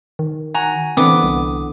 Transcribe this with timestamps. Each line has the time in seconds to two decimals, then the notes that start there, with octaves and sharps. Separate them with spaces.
0.19 D#3
0.55 F#4 G#5 A#5
0.97 D3 E3 B3 C4 D6 D#6
1.23 C2